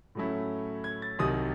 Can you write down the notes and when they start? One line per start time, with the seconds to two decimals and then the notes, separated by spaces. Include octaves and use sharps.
0.15 A2 F#3 A3 C#4 E4
0.84 G#6
1.02 A6
1.19 C2 C3 D#3 F#3 D#6